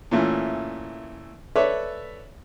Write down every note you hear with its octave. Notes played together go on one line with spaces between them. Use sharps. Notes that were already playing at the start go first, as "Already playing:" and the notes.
A#2 E3 A3 C#4
A4 B4 C#5 D5 E5